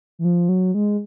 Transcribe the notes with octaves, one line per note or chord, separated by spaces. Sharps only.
E3
F3
F#3
G#3